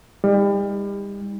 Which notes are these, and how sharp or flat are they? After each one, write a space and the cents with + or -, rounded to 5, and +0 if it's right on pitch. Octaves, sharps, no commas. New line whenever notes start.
G3 +35 D#4 +40